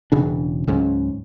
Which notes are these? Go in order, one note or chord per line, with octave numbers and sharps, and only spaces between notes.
E1 C#3 D4
C#2 G#2 F#3 C#4